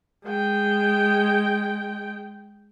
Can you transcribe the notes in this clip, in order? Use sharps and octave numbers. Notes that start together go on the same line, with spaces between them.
G#3 G5